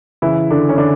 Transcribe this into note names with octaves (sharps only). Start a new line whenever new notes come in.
C#3 E3 E4
D3 D4
C#4
D3 D4